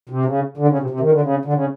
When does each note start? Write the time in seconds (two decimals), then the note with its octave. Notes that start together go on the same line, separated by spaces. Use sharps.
0.09 C3
0.26 C#3
0.57 D3
0.68 C#3
0.79 C3
0.90 C3
1.00 D#3
1.11 D3
1.21 C#3
1.45 D3
1.53 C#3